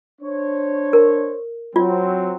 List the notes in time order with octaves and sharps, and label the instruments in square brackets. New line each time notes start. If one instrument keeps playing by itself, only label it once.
[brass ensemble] D4 C5 C#5
[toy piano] A#4
[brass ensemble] F#3 C4 [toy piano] F4